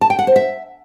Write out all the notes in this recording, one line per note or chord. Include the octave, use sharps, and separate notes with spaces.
A5
G5
F#5
C5
E5